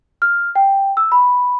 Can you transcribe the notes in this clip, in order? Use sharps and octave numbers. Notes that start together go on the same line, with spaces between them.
F6
G5
E6
B5